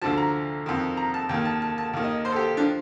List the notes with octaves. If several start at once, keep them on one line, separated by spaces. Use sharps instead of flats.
D2 D3 F3 A5
A#5
F2 D#3
A#5
A5
D#2 D#3 G5
A5
A5
A5
D#2 D#3
D#5
C5
A4
G4
D4
F3